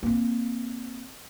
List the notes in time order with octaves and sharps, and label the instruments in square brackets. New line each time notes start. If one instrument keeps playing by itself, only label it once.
[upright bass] A#3 C4